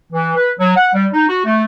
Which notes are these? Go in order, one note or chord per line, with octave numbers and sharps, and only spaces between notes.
E3
B4
F#3
F#5
G3
D#4
F#4
A3